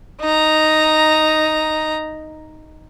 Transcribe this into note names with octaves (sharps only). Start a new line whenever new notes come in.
D#4 A#5